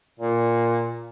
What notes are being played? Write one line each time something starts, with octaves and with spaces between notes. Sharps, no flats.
A#2